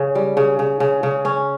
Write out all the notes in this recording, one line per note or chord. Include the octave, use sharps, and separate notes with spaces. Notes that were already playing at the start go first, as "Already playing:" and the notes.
Already playing: C#3 C#5
G3
C#3
C#3
C#3
C#3
C#4